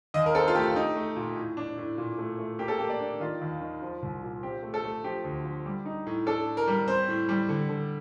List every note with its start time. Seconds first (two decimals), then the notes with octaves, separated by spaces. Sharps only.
0.14 D#2 D#5
0.26 A#4
0.35 C4 A4
0.48 F4
0.55 A3 G4
0.76 D#4
0.95 A3
1.16 A#2
1.36 A2
1.57 D4
1.78 A2
1.98 A#2
2.18 A3
2.39 A3
2.59 A#3 G4
2.68 A4
2.78 A#3 G4
2.90 D5
3.00 D4
3.20 D#3 F4
3.41 D#2
3.61 D#3
3.82 F3
4.02 C2
4.23 A#2
4.43 C4 G4
4.63 A3
4.74 A4
4.84 A3
5.04 F3 G4
5.24 D2
5.45 F3
5.66 G3
5.86 D#4
6.07 A2
6.26 D4 A4
6.47 A2
6.57 A#4
6.67 G3
6.87 C4 C5
7.08 A2
7.29 G3
7.49 D3
7.69 D3